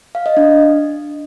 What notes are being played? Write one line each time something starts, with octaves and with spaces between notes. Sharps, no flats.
F5
D#5
D4